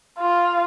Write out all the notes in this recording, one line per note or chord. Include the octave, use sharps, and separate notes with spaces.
F4